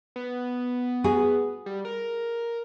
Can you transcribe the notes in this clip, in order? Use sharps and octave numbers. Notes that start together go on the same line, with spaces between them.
B3
F#4 G#4
G3
A#4